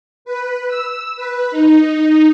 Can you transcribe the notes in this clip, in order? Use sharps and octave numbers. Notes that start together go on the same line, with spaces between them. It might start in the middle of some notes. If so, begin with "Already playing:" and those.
B4
E6
B4
D#4